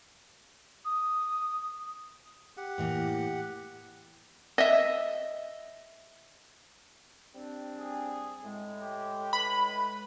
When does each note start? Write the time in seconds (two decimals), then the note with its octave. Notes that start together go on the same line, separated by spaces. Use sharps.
0.85 D#6
2.57 G4 F#5
2.78 A2 E3 A#3
4.58 D#5 E5
7.34 G3 C4 D4
7.78 G#4
8.44 A2 G#3
8.82 G4
9.33 B4 B5